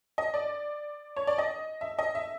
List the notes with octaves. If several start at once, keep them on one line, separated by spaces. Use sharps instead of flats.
D#5
D5
C#5
D5
D#5
E5
D#5
E5